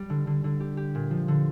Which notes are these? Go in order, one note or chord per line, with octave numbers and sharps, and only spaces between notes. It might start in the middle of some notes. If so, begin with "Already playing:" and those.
Already playing: G3
D3
D3
D3
G4
G4
A#2
F3
D3